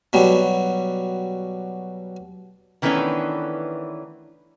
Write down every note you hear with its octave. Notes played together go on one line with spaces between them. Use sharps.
B2 F#3 G3
D#3 E3 A3 B3 C#4 D4